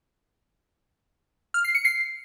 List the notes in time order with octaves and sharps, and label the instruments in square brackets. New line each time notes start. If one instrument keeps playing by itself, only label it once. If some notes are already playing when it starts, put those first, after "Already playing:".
[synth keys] F6
C7
C#7
C7